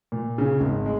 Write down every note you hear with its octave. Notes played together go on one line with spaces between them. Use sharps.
A#2
C#3
G#1
G#3